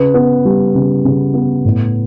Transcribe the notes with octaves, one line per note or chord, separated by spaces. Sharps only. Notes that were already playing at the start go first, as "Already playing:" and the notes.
Already playing: C#3 B4
B3
G3
C#3
C#3
B3
A2